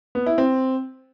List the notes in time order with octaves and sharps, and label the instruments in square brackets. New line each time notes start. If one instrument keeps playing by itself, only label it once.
[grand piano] B3
E4
C4